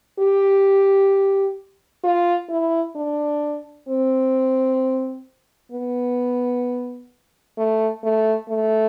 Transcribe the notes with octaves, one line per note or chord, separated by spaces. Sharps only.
G4
F4
E4
D4
C4
B3
A3
A3
A3